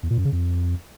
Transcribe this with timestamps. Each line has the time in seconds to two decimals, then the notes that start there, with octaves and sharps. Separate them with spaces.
0.03 E2
0.10 A#2
0.18 F#2
0.25 C#3
0.32 F2